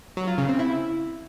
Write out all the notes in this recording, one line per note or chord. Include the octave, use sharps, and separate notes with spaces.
F#3
F4
C#3
C4
E4